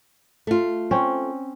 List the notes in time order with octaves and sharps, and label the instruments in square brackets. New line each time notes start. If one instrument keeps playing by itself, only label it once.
[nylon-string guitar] A3 F4
[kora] C4 C#4